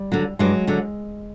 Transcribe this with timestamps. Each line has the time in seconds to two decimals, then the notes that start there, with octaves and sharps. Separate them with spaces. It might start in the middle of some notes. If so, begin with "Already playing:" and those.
Already playing: G3
0.12 D3 F#3
0.39 G2 F#3 G#3
0.67 D3 F#3